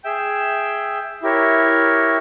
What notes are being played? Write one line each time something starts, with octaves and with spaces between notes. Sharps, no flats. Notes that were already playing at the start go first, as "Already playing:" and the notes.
G#4 E5 G5
E4 G4 A#4 C#5